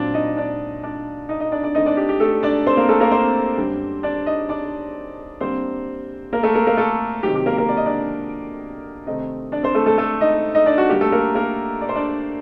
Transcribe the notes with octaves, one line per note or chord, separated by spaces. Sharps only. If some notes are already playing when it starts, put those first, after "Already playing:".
Already playing: A#2 F#3 C4 D4 D5
D#4 D#5
D4 D5
D4 D5
D#4 D#5
D#4 D#5
D4 D5
D4 D5
D3 A3 C4 D#4 D#5
D4 D5
G4
G4
A3 A4
D4 D5
C4 C5
A#3 A#4
A3 A4
A#3 A#4
C4 C5
F#2 D3 G3
D4 D5
D#4 D#5
D4 D5
D3 G3 A#3 C4 C5
A#3 A#4
A3 A4
A#3 A#4
A#3 A#4
A3 A4
C3 D#3 F#3 G4
G4
A#3 A#4
A#3 A#4
D5
D#5
D4 D5
C3 D#3 A3 C4 D#4 D#5
D4 D5
C4 C5
A3 A4
A3 A4
A3 A4
D#4 D#5
D#4 D#5
D4 D5
F#4
D3 G3 A#3 G4
A3 A4
A#3 A#4
A#3 A#4
D5
C5
D4 D5